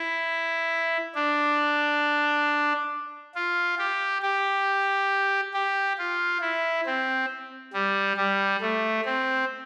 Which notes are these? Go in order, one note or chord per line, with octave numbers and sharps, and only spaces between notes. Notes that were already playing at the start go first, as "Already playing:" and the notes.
Already playing: E4
D4
F4
G4
G4
G4
F4
E4
C4
G3
G3
A3
C4